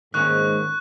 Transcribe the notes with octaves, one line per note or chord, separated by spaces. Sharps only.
G#2 D#3 A#3 C#4 C#6 F#6